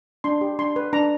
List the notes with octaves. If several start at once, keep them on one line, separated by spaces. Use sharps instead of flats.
D4 C6
G4
D4 C6
B4
D4 A#5